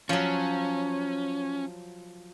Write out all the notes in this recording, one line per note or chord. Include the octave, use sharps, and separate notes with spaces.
F3 F#3 C#4